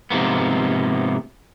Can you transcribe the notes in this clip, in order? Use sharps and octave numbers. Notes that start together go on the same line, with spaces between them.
G#2 C3 F3 A#3 B3